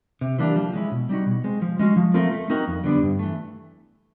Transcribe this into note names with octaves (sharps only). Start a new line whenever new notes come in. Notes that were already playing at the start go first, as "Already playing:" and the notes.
C3
E3 G3 A#3 D4
F3
G#3 C#4 E4
B2
G3 C4 D#4 F#4
B2
G#3 C4
F3
G#3 C#4 F#4
F3
A3 C4 F4 A#4
A3
C4 D#4 F#4 A#4
F2
D3 G3 B3 D4
G2
E3 A3